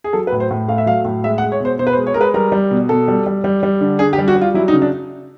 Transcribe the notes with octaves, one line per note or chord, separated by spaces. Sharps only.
G#4
F#3 A4
B4
A2
C5
A2
A3 F5
E5
F#3 F5
A2
G#3 E5
F#5
G#3
C#5
B2 C5
B2 C5
B4
C5
G#3
C#5
G#3 A#4
B4
G3 A#4
G3
B2
B2 A4
G3
G3
G3
G3
D3
D3 G#4
G4
G3
F#4
G3
F4
F#3 E4
D#4
C#3
D4